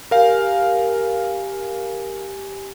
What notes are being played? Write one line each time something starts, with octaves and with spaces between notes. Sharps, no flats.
G4 A#4 F5 G#5